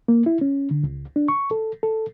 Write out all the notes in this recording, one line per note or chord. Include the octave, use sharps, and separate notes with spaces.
A#3
E4
C#4
D3
C#2
D4
C#6
A4
A4